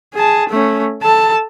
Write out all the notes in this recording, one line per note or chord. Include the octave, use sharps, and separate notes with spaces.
G#4 A5
A3 C#4
A4 A5